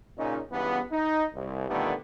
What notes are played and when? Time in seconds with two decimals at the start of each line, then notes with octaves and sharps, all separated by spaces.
0.17 A#2 C#3 C#4 D#4
0.51 C#2 G2 E3 B3
0.92 D#4
1.34 C2
1.68 A#2 D3 D#3 G3 A3 B3